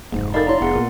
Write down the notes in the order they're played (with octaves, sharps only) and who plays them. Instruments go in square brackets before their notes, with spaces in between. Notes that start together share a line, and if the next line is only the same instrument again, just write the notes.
[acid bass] F1 [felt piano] G#2
[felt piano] D#4 A4 A6 [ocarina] A#4 [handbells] D5 F5 B5
[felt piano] D4 E4 [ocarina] C#5 [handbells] A#5 C6
[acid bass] F1 [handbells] B3 F#5 [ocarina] G#4
[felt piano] A#2 [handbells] A#4